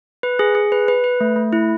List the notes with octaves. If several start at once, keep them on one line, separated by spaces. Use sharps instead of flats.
B4
G#4
G#4
B4
B4
B4
A3
A3
E4